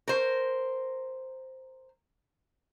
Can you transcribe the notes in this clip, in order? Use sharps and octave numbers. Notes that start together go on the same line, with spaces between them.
A#4 C5